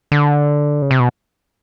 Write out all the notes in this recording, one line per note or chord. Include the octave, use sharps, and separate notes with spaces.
D3
C#3
C3
B2